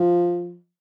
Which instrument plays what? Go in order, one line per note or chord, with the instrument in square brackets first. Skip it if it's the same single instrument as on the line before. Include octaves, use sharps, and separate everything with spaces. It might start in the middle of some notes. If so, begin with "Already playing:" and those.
Already playing: [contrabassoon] F3